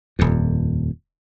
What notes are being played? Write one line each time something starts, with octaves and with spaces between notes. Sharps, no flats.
D#1 F2